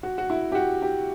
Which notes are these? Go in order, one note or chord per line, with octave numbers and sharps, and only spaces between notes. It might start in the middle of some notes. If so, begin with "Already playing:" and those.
F#4
F#4
E4
G4
F#4
G4